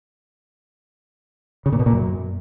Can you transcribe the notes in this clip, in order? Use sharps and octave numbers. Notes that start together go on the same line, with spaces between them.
C#3
A#2
B2
A#2
F#2